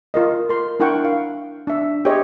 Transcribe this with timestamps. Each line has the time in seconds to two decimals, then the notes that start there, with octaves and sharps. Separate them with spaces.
0.14 F4 A#4 D#5
0.49 A#4 C6
0.80 D4 E4 A#4 F#5 G5 C#6
1.05 F5
1.67 D4 E5
2.05 G4 G#4 C5 C#5 D#5 E5